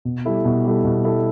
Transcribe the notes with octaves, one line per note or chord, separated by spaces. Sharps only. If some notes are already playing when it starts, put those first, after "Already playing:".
B2
G3 E4 A4
B2
G3 E4 A4
B2
G3 E4 A4